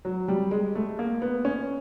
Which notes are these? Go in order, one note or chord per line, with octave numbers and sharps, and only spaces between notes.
F#3
G3
G#3
A3
A#3
B3
C#4